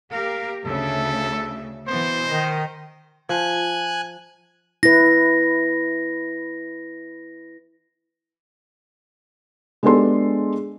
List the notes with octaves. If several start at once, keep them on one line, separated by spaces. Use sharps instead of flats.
A#3 G4 A#4 F5
D2 C#3 A4 E5
B2 E3 B3 C5
D#3 D#5
F3 G#5 F#6 G#6
E4 B4 A#6
G#3 B3 D4 G4 A4 C6